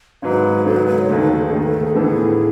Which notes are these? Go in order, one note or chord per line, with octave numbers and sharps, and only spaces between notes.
G#1 G#2 F#3 B4
G#1 G#2 F#3 A4
B4
B4
C#5
D#2 D#3 A3 B4
B4
A4
G#4
D#2 D#3 A3 A4
B4
A4
G#4
A2 E3 B3 D#4 G#4 A4